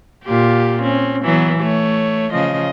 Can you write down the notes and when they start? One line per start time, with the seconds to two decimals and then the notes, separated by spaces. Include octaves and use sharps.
0.25 A#2 F4 G4
0.82 C4 C#4
1.23 E3 F#3 B3
1.59 A3 C#5
2.33 C#3 F3 D#5